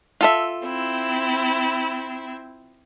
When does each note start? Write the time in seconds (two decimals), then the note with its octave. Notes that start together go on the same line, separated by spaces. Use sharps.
0.21 F4 A4 E5
0.65 C4 E4